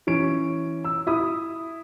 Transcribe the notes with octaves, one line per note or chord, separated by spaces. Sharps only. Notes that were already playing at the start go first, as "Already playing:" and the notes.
E3 C#4 D7
E6
E4 B5 D#6